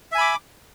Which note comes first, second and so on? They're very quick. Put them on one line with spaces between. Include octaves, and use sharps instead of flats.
E5 G#5 B5 D6